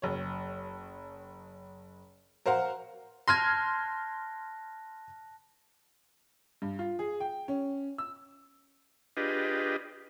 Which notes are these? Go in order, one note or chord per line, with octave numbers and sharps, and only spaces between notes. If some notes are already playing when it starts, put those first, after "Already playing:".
F#1 C#5
A#4 C5 F5 F#5 A#5
A5 C6 F6 F#6 G#6 A#6
G2
F4
G#4
G5
C#4
E6
D4 F4 G4 G#4 B4 D#5